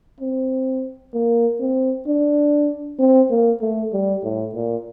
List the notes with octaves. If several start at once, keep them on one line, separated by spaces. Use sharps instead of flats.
C4
A#3
C4
D4
C4
A#3
A3
G3
A2
A#2